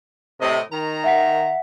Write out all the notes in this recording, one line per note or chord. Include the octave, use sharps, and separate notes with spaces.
A2 C3 D#5
D#3 A#5
E5 F#5 B6